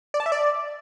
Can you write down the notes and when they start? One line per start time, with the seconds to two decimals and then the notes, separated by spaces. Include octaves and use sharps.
0.14 D5
0.20 A5
0.26 E5
0.32 D5